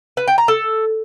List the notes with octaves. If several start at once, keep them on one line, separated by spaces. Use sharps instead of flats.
B4
G5
A#5
A4